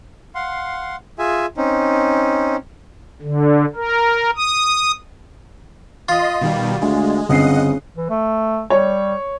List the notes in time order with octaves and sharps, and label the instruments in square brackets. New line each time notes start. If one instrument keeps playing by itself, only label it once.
[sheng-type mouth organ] F5 F#5 C6
F4 G#4 E5 G#5
C4 C#4 D#4
[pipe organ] D3
A#4
D#6
[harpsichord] F4 [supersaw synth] D#5 C6
[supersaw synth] B2 D#3 G3
[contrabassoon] D2 [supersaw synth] G#3
[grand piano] G1 C4 C7 [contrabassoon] C#3 [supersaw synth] D#5 F#5 D#6
[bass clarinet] E3
A3
[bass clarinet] G3 [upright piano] C#5